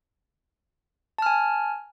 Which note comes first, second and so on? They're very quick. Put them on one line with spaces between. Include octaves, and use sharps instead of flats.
A5 F6 G#5